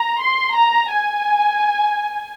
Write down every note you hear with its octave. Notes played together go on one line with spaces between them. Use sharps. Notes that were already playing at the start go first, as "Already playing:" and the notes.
Already playing: A#5
C6
A#5
G#5